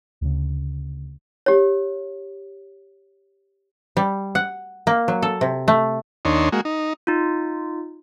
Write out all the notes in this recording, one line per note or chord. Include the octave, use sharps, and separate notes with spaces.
D2 C#3
G4 C#5
G3
F#5
A#3
F#3
A4
C3
A3
D#2 D4 D#4 C#5 C6
G#3 A#3 F#4
D#4
D#4 F4